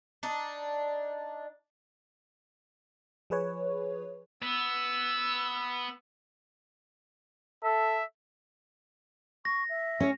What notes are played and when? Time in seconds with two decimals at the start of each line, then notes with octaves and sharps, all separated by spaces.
0.23 D4 D#4
3.30 F3 G#4 B4 C#5
4.43 B3 E6
7.64 A4 E5
9.45 C#6 A#6
9.69 E5
10.00 C#4 C#5